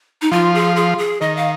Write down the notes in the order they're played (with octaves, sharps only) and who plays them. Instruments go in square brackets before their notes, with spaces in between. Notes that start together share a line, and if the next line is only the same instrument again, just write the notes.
[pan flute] D#4
[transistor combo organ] F3 [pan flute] F4
[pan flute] G#4
G#4
G#4
[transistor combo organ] D#3 [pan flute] D#5
[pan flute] F5